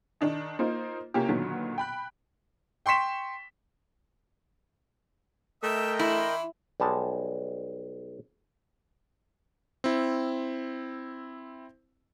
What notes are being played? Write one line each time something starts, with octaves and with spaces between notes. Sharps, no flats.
D#3 D4 D#4
A#3 D#4 F4 C5
C3 A#3 C#4 F4 G4
A#2 D3 D#3 F#3 B3
G5 B5 F#6
G5 C6 C#6 B6 E7
A3 A#4 D#5 E5 G5 D#6 E6
E3 E4 B5 C6
B1 G3 G#3 A5
C4 E4